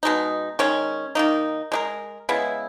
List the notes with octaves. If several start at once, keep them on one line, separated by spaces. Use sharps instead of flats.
B2 G#3 D#4
D#3 G#3 C#4
D#3 A#3 D#4
G#3 D#4 A#4
C#3 G#3 B3 E4